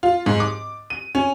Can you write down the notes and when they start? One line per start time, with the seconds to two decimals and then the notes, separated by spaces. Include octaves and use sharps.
0.03 F4
0.26 G#2
0.40 D6
0.90 D#7
1.15 C#4